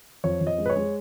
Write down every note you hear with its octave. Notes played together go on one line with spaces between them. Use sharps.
F2 C#5
F2
D#5
G#3
B4
C#5
G#3